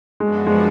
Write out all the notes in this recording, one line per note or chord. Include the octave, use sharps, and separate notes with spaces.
F#2 F3 G#3 B3 D4 F#4
G#3